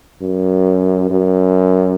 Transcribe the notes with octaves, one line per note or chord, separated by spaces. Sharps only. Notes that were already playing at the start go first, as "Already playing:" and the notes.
F#2
F#2